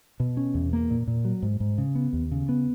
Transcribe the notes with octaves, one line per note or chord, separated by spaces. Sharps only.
B2
C#4
E2
A#3
A#2
A#2
F#3
G#2
G#2
C#3
B3
D#2
C#3
B3